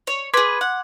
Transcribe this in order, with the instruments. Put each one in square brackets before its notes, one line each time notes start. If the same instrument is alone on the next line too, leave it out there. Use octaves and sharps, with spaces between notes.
[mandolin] C#5
[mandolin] G#4 B4 [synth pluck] C6 D6 G#6
[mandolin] F#5